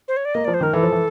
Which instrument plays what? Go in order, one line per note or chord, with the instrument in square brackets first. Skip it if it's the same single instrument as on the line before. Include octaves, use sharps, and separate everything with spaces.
[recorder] C5
C#5
D5
[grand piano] A#3 [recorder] D#5
[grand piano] F3 [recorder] D5
[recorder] C5
[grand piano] D#3 [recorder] A#4
[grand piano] E3 [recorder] A4
[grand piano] F3
E3